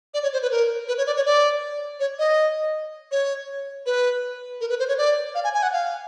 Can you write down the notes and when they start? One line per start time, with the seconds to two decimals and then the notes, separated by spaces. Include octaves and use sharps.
0.14 D5
0.23 C#5
0.33 C5
0.42 B4
0.51 A#4
0.88 B4
0.98 C#5
1.07 D5
1.16 C#5
1.26 D5
2.00 C#5
2.19 D#5
3.12 C#5
3.86 B4
4.61 A#4
4.70 B4
4.79 C5
4.88 C#5
4.98 D5
5.35 F5
5.44 G#5
5.54 G#5
5.63 F#5
5.73 F5